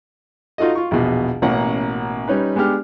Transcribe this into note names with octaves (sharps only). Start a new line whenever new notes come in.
D#4 F4 F#4 A4 D#5
F4 C#6
A#1 E2 B2
A1 B2 A#3 C#4 F#5
G3 C#4 D#4 B4
G#3 B3 D4 G4 F6